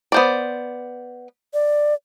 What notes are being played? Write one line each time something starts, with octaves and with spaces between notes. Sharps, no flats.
B3 C5 D5
D5